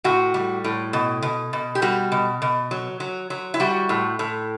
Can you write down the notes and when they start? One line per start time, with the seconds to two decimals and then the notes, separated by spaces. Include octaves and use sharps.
0.04 A2 F#4
0.34 G3
0.64 A2
0.93 B2
1.22 B2
1.53 B2
1.75 G4
1.82 G3 F#4
2.12 B2
2.42 B2
2.71 F#3
3.00 F#3
3.30 F#3
3.54 E4
3.60 G3 F#4
3.89 A2
4.19 A2